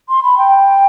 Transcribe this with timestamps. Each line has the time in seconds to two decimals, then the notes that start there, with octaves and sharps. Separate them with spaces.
0.09 C6
0.23 B5
0.38 G5